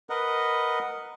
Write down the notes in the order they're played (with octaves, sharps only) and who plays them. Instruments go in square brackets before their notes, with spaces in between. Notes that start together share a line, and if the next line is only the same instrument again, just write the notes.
[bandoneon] A#4 B4 D#5 F#5